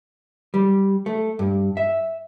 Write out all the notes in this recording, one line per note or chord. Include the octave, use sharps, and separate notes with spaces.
G3
A3
G2
E5